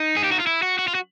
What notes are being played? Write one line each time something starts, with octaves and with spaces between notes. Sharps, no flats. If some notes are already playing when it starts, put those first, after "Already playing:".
Already playing: D#4
G#4
G4
F#4
F4
E4
F#4
F#4
F4
F#4